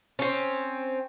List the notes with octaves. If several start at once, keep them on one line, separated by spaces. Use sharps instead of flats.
C4 C#4